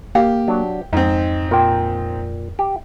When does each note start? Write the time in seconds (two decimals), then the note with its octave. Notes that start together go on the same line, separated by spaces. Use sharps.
0.15 A#3 G4 F5
0.48 F#3 D4
0.93 F2 G#2 C4 D#4
1.51 A#2 A#4 G5
2.59 G4